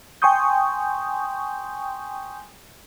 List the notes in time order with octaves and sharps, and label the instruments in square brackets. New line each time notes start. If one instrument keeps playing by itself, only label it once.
[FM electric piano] G5 G#5 C6 C#6 D#6 G6